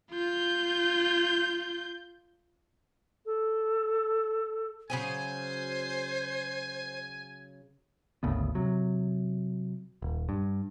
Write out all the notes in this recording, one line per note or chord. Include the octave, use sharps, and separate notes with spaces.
F4 G6
A4
C#3 F#3 G#4 C5 G#5
G#1 D2 C#3 B3
C3 F#3
D#1
G2